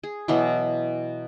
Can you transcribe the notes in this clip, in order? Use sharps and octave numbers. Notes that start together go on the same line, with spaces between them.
G#4
B2 E3 F#3